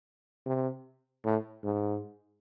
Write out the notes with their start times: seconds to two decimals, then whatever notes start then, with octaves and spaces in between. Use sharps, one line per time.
0.46 C3
1.25 A2
1.64 G#2